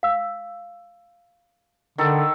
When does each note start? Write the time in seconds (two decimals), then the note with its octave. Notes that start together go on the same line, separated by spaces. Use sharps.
0.03 F5 E6
1.98 D3 D#3 A4